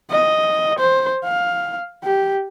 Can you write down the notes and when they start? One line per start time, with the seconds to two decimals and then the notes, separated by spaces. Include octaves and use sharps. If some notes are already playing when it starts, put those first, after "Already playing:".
0.11 D#5
0.79 C5
1.25 F5
2.04 G4